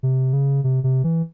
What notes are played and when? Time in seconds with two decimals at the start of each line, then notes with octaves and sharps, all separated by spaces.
0.03 C3
0.33 C#3
0.64 C3
0.84 C3
1.04 E3